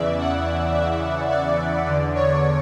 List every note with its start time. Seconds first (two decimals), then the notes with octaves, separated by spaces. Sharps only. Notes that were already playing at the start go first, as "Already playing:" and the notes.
Already playing: E2 C#3 E3 D5 E5
0.18 F#5
0.75 E5
1.30 D5
1.86 E2 D3 D5
2.15 C#5